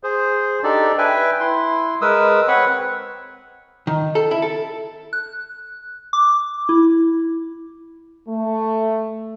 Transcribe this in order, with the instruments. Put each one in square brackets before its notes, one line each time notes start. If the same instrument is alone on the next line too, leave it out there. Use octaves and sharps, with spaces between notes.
[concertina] G#4 C5
D4 D#4 G4 A4 D5
B4 E5 G5 G#5
E4 C6
G#3 A#4 B4 D#6 E6
C4 B4 C#5 F#5 B5 C#6
[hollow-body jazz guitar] D#3
A4
E4
A4
[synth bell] F#6
D6
E4
[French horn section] A3